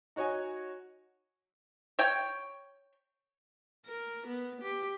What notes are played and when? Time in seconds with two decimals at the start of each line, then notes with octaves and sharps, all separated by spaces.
0.16 D#4 F#4 C#5 D#5 G#5
1.99 C#5 G5
3.86 A#4
4.27 B3
4.62 G4